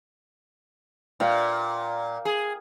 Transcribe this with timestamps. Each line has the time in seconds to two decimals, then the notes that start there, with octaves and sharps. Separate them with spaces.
1.20 A#2 F5 G5
2.25 G#4